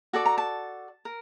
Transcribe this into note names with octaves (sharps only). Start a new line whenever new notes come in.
F#4 A4 D5 A5
A#5
A5
A#4